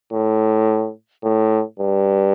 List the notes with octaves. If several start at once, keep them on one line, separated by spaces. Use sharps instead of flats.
A2
A2
G2